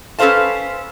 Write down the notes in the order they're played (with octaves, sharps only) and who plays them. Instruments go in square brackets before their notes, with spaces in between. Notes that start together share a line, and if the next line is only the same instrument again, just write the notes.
[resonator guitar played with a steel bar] C#4 A4 B4 C5 F5 A5